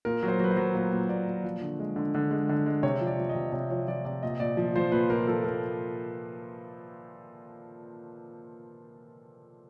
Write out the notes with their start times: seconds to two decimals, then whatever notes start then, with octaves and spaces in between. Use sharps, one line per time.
0.05 A#2 A#4
0.23 F#3
0.28 C5
0.40 F#3 B4
0.51 C5
0.57 F#3
0.74 A#2 B4
0.92 A#2
1.09 A#2 D5
1.27 A#2
1.44 F3
1.61 D3
1.79 G#3
1.96 D3
2.15 D3
2.31 G#3
2.49 D3
2.66 G#3
2.83 C3 C#5
3.01 F3
3.07 D5
3.19 F3
3.29 D#5
3.35 C3
3.53 C3 C#5
3.70 F3 C#5
3.87 F3 D5
4.05 C3 D5
4.23 A#2 D#5
4.40 A#2 D5
4.57 F3
4.76 F3 C5
4.92 A#2 B4
5.10 A#2 A#4
5.27 F3 A4
5.44 A#2 A#4